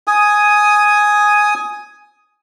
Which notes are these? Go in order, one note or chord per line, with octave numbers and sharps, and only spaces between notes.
G#5 D#6